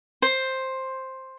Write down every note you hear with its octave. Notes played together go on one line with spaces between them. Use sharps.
C5